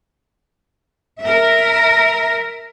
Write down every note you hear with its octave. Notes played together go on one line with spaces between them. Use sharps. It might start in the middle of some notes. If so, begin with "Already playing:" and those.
A#4 E5